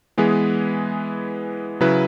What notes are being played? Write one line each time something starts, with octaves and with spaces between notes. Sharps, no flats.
E3 G#3 B3 G#4 B4
C#3 F#3 E4 B4